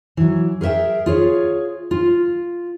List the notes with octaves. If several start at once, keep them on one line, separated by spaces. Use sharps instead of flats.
E3 F#3
G#4 A#4 B4 E5 G5
F4 G#4 C#5
F4